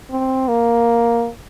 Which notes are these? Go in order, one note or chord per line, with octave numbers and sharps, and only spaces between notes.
C4
A#3